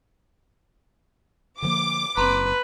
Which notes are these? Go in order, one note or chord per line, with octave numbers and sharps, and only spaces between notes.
D3 F3 A#3 D6
F#1 C4 B4 A#5 C6